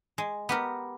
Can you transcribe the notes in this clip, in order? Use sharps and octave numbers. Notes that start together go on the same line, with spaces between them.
G#3
B3 G4 A#4